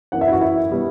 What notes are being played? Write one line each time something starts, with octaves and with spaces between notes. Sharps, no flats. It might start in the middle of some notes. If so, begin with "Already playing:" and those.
F#2 E3 B3 F#5
E5
E4
F#4
E4
B2 G3 B3